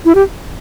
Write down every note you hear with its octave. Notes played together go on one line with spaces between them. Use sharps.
E4
G4